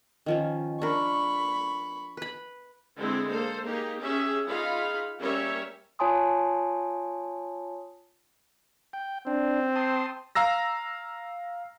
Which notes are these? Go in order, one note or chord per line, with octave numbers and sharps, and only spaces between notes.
D#3 F3 C#4
D4 A#4 B5 C#6
B4 B5
D3 G#3 C4 D4 E4
A#3 A4 C5
A#3 D#4 G4 G#4
C#4 G4 G#4 E5
D#4 F4 G#4 F5 B5
G3 A#3 C#4 G4 C#5 E5
F4 C#5 G#5 A5 C6 D#6
G5
C4 D4
A5 C6 D#6
F5 A#5 E6 A#6